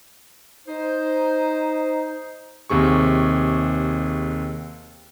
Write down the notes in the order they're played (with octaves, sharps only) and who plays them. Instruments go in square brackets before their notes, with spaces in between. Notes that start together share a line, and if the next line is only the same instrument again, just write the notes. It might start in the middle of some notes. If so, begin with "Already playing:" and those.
[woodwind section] D#4 C5
[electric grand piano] D#2 C3 G#4 C#6